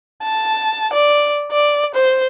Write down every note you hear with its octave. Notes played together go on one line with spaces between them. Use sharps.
A5
D5
D5
C5